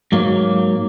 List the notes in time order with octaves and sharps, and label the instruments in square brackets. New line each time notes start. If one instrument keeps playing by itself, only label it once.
[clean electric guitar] G#2 F#3 A#3